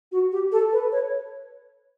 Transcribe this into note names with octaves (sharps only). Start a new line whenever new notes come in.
F#4
G4
A4
B4
C#5